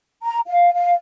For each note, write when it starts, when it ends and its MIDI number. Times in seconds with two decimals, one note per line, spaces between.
0.23 0.39 82
0.47 0.72 77
0.74 0.91 77